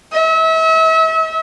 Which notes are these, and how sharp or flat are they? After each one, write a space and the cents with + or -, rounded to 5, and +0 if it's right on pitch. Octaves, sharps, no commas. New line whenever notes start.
E5 -35